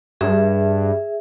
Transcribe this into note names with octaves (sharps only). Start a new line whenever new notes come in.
G2 G#4 E5